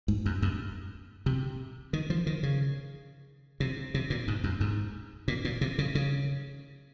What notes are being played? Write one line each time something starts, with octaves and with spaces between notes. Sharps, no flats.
G#2
F#2
F#2
C3
D#3
F3
D#3
C#3
C3
C3
A#2
G#2
F#2
G#2
A#2
A#2
C3
C#3
C#3